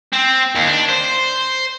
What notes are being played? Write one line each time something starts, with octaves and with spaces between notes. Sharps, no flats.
C4
D#2
D4
C5